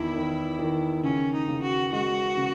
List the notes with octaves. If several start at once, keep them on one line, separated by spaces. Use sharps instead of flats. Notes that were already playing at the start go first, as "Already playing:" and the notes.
Already playing: E2 D#3 E4
D#3
D#3
C#3 C#4
D#4
C#3
F#4
G#3 F#4
C#3